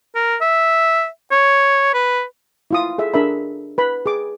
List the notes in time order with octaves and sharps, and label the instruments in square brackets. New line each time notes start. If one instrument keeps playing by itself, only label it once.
[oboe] A#4
E5
C#5
B4
[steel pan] E4 F4 D#6
G#4 A4 E5
D4 G#4 A#4 E5 B5
B4 B5
G#4 D6